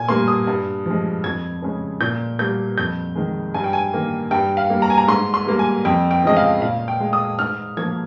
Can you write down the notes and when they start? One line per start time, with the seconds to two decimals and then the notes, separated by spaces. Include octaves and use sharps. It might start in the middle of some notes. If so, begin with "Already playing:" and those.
Already playing: A#2 G#5
0.08 G3 A#3 C6
0.28 D#6
0.47 G2
0.86 F3 G#3
1.24 F2 G#6
1.62 C#3 G#3
2.01 A#2 G6
2.39 G3 A#3 G6
2.78 F2 G6
3.15 D#3 G#3
3.54 G2 G#5
3.64 G5
3.73 G#5
3.93 D#3 A#3
4.31 G2 G5
4.57 F5
4.70 G3 A#3
4.82 A#5
4.90 G#5
4.98 A#5
5.08 G#2 C6
5.34 C6
5.46 G3 A#3
5.59 G#5
5.85 F2 G5
6.11 G5
6.23 C#3 F3 G#3 D#5
6.37 F5
6.62 A#2 F5
6.88 G5
7.00 G#3
7.13 D#6
7.39 G#2 F6
7.77 F3 A#3 G#6